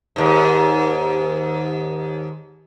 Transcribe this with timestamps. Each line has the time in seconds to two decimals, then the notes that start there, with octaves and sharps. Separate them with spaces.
0.16 D#2 G#2